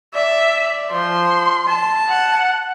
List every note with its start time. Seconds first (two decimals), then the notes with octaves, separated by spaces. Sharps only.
0.14 D5 E5
0.92 F3 C6
1.67 A5
2.09 F#5